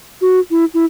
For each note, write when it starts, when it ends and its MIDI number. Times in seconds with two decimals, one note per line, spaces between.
0.21 0.39 66
0.51 0.65 64
0.74 0.85 64